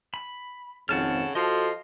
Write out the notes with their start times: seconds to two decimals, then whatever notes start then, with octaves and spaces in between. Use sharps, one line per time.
0.14 B5
0.89 G#1 F2 C#3 F#5 A5 F6
1.35 F3 F#4 A4 D#5 F5